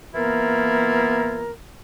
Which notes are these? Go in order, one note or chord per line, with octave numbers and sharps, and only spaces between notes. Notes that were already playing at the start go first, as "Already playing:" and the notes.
E3 A#3 B3 E4 F4 A#4